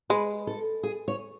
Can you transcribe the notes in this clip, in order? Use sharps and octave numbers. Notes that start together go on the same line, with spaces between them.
G#3 B4
A4
G#4
C#5